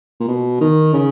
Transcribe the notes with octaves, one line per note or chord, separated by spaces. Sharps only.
A#2
B2
D#3
C#3